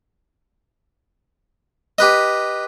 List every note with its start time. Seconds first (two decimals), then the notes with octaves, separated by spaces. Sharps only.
1.98 G4 B4 D#5